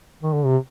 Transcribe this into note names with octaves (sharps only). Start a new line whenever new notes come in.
D#3
D3
C3